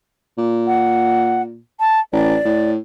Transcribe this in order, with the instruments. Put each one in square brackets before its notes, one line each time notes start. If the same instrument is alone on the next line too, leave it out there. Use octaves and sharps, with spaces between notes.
[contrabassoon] A#2
[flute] F#5
A5
[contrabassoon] A1 [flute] D5
[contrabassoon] A2